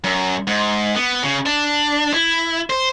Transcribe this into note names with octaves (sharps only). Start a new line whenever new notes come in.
F#2
G#2
B3
C#3
D4
E4
C5